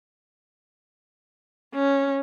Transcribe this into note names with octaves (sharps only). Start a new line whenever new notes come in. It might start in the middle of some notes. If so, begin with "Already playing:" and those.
C#4